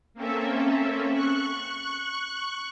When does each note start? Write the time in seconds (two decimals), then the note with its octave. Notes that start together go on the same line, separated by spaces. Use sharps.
0.14 A#3 C4 C#4 A4 E5
1.12 C#6 F#6